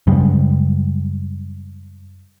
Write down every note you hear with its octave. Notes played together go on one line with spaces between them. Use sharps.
F#2 C#3 G3 G#3